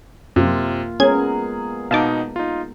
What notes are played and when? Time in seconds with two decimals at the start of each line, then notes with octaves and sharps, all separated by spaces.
0.36 F#2 C3 A#3 F4
1.00 G#3 B3 C#4 G#4 A#4 G#6
1.91 B2 D#4 F5 A5 D6
2.36 D#4 F4